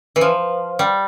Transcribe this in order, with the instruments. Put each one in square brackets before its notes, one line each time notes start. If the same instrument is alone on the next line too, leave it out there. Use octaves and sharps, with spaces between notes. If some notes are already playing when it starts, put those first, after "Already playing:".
[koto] E3
F3
G3